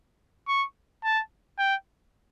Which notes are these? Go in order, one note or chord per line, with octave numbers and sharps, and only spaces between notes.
C#6
A5
G5